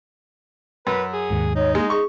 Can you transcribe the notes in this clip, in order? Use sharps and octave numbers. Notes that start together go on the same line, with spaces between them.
F#2 B4
G#4
D#2 G#2
D#4 C#5
G#3 A#3
G#4 C#6